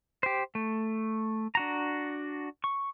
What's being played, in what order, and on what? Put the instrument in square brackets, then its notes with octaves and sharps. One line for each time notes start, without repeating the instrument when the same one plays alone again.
[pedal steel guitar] G4 C5
A3
D4 F#4 A#5
C#6